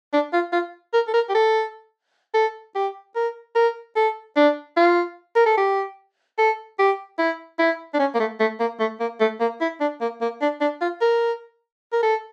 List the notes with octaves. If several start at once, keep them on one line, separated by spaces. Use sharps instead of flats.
D4
F4
F4
A#4
A4
A#4
G4
A4
A4
G4
A#4
A#4
A4
D4
F4
A#4
A4
G4
A4
G4
E4
E4
D4
C#4
A#3
A3
A3
A#3
A3
A#3
A3
A#3
E4
D4
A#3
A#3
D4
D4
F4
A#4
A#4
A4